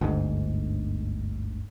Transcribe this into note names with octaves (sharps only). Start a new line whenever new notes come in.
G1 D2 G#2